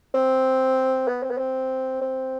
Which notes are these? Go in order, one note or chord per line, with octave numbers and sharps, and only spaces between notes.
C4
B3
C4
B3
C4
C4